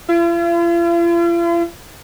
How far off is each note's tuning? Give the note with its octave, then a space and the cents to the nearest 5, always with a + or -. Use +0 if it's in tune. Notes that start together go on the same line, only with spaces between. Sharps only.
F4 -45